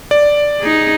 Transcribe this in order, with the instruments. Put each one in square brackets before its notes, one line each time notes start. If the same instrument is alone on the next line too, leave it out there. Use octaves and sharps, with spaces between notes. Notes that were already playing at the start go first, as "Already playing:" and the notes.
[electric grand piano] D5
[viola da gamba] D#4 G#4